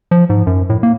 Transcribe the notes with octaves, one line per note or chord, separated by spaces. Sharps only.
F3
G#2
F#2
A2
A#3